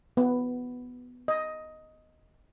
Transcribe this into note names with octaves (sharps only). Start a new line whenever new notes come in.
B3
D#5